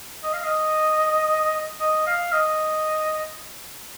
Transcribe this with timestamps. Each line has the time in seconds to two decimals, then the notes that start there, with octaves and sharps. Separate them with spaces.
0.24 D#5
0.33 F5
0.44 D#5
1.80 D#5
2.07 F5
2.32 D#5